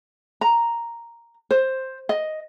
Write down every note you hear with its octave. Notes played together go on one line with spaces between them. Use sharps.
A#5
C5
D#5